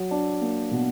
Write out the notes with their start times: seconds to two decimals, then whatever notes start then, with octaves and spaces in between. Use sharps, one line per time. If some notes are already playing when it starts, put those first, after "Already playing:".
Already playing: F#3
0.11 D4
0.41 A#3
0.71 B2